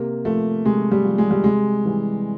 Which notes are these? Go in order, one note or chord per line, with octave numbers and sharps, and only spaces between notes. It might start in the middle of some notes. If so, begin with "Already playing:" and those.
Already playing: C3 A#3
F3 A3
C3 G#3
G3
F3
G#3
G3
C3 G#3
E3 G3